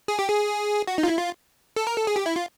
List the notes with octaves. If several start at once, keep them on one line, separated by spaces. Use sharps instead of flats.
G#4
G4
G#4
F#4
D#4
F4
E4
F4
A4
A#4
A4
G#4
G4
E4
F4